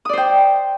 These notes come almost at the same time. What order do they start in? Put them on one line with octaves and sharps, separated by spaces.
D#6 D5 C5 G5